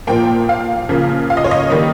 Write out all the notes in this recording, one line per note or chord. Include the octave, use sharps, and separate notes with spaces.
A#2 F3 A#3 G5
F5
C#3 F3 A#3
F5
D#5
C#5
D#5
D#3 G3 A#3